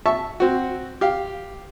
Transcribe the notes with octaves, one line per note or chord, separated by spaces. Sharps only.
E5 A5 C#6
C4 F#4
G4 F5